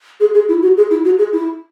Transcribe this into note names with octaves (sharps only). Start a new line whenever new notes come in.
G#4
G#4
E4
F#4
G#4
E4
F#4
G#4
E4